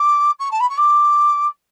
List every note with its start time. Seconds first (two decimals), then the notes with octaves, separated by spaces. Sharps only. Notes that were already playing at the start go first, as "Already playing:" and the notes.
Already playing: D6
0.39 C#6
0.51 A5
0.60 B5
0.69 C#6
0.77 D6